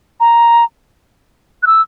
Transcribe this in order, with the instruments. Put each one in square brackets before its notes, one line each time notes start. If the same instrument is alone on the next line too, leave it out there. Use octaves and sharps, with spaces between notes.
[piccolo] A#5
F#6
E6